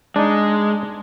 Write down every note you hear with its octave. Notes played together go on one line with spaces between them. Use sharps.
G#3 D4 D#4